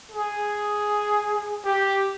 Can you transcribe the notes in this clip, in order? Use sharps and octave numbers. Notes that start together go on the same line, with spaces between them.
G#4
G4